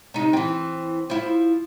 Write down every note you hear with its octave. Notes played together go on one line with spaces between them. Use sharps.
C3 D#4
E3 C4
F3 E4